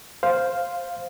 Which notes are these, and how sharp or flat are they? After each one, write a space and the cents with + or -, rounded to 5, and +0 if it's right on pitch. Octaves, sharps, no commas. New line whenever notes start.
C5 +0 F5 +0